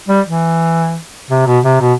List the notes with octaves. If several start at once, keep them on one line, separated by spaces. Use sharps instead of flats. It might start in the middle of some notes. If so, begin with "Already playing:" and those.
G3
E3
C3
B2
C3
B2